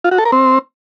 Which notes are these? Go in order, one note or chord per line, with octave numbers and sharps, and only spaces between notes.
F4
F#4
A4
A#4
C4